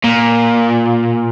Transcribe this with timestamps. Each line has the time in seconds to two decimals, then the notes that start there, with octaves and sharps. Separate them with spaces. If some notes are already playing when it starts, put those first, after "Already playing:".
0.04 A#2